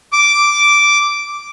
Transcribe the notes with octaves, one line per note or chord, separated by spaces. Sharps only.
D6